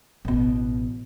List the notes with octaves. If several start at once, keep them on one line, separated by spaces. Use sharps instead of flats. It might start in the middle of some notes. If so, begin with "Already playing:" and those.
A1 B2